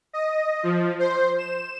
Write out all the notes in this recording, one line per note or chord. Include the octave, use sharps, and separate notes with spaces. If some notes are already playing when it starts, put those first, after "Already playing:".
D#5
F3
C5
E7